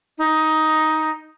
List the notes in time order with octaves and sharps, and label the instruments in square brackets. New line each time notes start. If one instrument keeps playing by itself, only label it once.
[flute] D#4